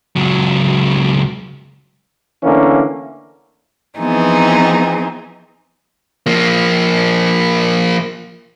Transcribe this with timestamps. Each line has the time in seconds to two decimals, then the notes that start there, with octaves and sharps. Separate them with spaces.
0.16 C#2 F#3
2.43 D3 E3 A3 A#3 C#4
3.98 E3 F3 B3 C4 D#4 G#4
6.26 F3 A#3